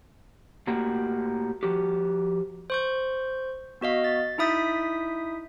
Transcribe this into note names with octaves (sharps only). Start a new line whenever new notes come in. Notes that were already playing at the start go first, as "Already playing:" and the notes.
A2 A#3 F#4 G4
F3 F#4 G4
C5 C#6 G6
B3 F#4 D#5 F5 B6
A6
D#4 E4 E5 D#6 G6 B6